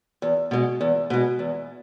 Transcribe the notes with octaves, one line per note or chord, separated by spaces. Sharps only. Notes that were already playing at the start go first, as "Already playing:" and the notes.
E2
B2 G#3
E2
B2 G#3
E2